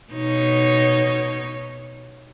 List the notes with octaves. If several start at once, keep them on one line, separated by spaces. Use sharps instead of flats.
B2 D#4 C#5